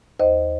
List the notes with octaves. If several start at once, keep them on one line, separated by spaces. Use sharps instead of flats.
D#2 C5 D#5